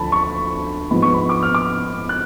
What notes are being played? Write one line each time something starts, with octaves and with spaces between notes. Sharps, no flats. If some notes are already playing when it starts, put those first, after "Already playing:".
Already playing: D2 D3 F3 A3 A5 B5
C#6
G#2 F3 B3 B5
C#6
B5
D6
F6
D6
F#6